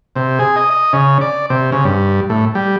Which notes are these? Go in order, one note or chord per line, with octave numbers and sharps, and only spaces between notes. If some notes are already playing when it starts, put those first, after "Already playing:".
C3
G#4
D#5
D#5
C#3
D5
C3
C#3
G2
A2
G3